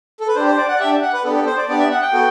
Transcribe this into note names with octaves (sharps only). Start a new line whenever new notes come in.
A4
B4
D4 G4 C5
C5
D5
F#5
D5
D4 G4 E5
F#5
B4
B3 D4 G4 A4
A4
C5
D5
B3 D4 G4 D5
E5
F#5
G5
B3 F#4 A4